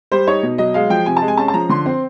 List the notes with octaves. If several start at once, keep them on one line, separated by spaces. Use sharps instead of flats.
G3 C5
D#4 C#5
B2
F#3 D#5
G#3 F5
F3 G5
C3 G#5
A5
G#3
G#5
C#4 A5
A5
F3 A#5
D3 C6
C4